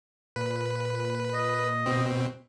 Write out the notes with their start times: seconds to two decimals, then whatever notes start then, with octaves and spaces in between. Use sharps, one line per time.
0.36 A#2 B4
1.34 D#5
1.86 B2 C4